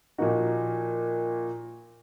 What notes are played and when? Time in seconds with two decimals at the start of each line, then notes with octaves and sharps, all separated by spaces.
0.18 A#2 F3 A#3 D#4 F#4